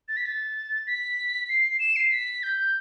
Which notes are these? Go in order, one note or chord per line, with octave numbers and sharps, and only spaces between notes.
A6
B6
A6
B6
C7
E7
C7
B6
G6